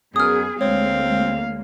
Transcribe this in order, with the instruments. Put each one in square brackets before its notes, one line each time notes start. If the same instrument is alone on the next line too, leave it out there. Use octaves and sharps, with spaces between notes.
[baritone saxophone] F#2 [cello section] B3 G#4 [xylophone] D#6 F6
[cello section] D2 G#3 A#3 [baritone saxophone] C4 [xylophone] C#5 [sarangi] F5